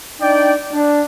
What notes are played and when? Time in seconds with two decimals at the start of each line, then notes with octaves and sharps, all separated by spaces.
0.20 D4 D#4 D5 G5
0.72 D4